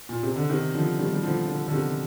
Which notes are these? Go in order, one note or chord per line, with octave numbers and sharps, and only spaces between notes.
A#2
C3
D3
C3 D#3
D3 F3
D#3 G3
G3
D3 F3
D3 F3
D3
C3 D#3